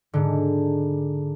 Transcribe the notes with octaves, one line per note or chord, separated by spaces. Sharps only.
G#2 D3